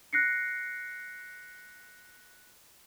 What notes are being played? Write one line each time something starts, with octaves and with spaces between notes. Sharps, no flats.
F#6 A#6 C7 C#7